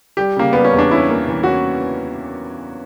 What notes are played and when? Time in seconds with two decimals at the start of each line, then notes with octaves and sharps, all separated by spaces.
0.17 G3 G4
0.36 C#3 A#3
0.53 G3 B3
0.65 C#4
0.73 E2
0.78 D4
0.91 C#4 E4
1.09 A#3
1.28 E3
1.43 F#4
1.47 C#4